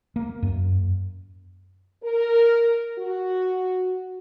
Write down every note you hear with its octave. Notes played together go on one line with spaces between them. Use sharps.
A#3
F#2
A#4
F#4